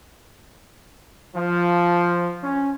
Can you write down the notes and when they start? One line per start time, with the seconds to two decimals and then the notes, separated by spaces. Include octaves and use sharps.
1.35 F3
2.43 C#4